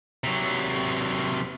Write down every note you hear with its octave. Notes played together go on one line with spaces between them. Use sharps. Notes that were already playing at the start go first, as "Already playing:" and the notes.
C3 F#3